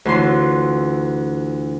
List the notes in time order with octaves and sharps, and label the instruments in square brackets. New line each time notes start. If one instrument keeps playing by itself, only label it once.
[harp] D2 E3 F4 C6